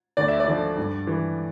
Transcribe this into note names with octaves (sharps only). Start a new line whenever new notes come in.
D2 D5
E5
D5
D3 F3
G2
E3